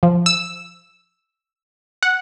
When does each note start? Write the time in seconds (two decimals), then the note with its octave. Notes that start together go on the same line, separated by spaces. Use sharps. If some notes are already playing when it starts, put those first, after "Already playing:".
0.03 F3
0.26 E6
2.03 F#5